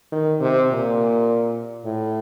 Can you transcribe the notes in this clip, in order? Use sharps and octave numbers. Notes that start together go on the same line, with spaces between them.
D#3
C3
A#2
A2